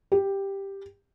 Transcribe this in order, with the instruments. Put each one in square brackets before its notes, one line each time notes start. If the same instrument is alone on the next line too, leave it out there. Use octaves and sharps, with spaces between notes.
[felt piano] G4